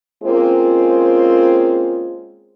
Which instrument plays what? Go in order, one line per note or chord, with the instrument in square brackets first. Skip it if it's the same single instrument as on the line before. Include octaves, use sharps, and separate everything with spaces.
[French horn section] G#3 A#3 C4 C#4 F4 G#4